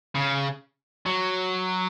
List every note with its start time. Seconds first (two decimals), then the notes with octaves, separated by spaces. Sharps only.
0.15 C#3
1.06 F#3